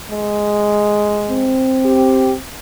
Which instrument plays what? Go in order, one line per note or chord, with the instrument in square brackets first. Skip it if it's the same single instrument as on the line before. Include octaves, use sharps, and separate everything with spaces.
[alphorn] G#3
[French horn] C4
[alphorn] G4